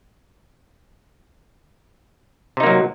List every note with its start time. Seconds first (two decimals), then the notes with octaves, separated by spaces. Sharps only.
2.57 C3
2.60 D#4
2.63 A#3
2.66 F#3